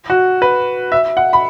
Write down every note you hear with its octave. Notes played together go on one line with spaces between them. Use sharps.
F#4
B4
E5
F#5
B5